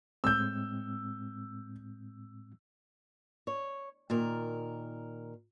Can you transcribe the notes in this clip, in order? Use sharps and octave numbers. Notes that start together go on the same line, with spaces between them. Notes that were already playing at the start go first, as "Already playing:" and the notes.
A2 G#3 C4 E6 G6
C#5
A#2 D#3 A#4